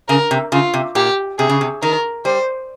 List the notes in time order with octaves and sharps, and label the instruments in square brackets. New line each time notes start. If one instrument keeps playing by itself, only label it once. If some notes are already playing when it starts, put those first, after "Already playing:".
[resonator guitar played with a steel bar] C#3 [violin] A#4
[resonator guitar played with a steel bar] C3
[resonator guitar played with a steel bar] C#3 [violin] F4
[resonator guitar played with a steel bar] C3
[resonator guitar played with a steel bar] A#2 [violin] G4
[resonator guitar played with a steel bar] C3 [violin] G#4
[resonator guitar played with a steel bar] C#3
C3
[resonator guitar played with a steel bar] D#3 [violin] A#4
[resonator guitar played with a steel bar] G3 [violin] C5